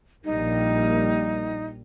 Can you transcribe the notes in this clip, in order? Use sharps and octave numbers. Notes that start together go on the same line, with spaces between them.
A#1 G3 A#3 D#4